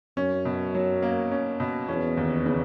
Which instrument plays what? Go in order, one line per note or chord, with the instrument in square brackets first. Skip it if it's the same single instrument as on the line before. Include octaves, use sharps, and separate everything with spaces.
[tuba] F#2 [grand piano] C#4
[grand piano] B2
F#3
A#3
C#4
B2
[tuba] E2 [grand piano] C#4
[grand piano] D#2
C#3